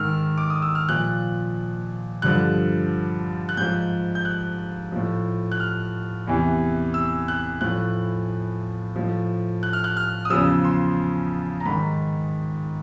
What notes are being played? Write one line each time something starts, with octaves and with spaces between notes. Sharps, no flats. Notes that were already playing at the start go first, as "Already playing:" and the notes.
Already playing: G#2 D#3 E6 F6
D6
D#6
E6
F6
A#2 F3 F#6
G2 D3 F3 F#6
F#6
G#2 F3 G6
G6
F#6
A2 F3
F#6
F6
E2 C3 E3
E6
F#6
A2 F3 F#6
A2 F3
F#6
F6
F#6
F6
D#6
E2 C#3 F3 E6
C6
A#5
G#2 D#3 B5